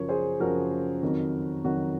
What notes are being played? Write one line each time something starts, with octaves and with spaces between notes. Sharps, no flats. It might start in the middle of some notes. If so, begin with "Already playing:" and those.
Already playing: F#2 C#3 F3 A#4 C#5
G#4 C5
F#2 C#3 F3 F#4 A#4
F2 D#3 F#3
F2 D#3 F#3 F#4